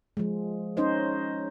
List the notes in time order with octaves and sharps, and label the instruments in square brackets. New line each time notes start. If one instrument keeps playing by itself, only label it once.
[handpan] F3 G#3
C#4 D#4 C5 D#5